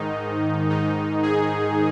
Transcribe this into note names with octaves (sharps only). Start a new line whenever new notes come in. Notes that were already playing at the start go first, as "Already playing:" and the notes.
Already playing: G#2 D#3 D#4
G#2 D#3 D#4
G#4